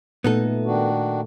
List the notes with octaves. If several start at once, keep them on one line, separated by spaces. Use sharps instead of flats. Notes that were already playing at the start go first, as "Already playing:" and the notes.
A#2 A3 B3 D#4 A4
D#3 D4 F#4